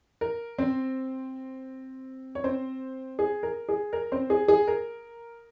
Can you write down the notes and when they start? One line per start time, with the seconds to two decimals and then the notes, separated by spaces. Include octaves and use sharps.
0.21 A#4
0.58 C4 C5
2.35 C#5
2.44 C4 C5
3.19 G#4
3.43 A#4
3.69 G#4
3.93 A#4
4.12 C4 C5
4.30 G#4
4.48 G#4
4.68 A#4